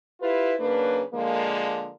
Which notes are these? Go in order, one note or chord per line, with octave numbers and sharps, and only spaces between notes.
E4 F4 G4 B4
C#3 F#3 A#3 D4 B4
D3 F3 G#3 A#3